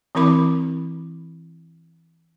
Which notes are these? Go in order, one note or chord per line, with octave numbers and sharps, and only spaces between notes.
E3 C4 E4 A#4 B5 D6